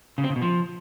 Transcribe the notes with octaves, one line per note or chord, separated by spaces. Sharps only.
C#3
C4
C#3
B2
F3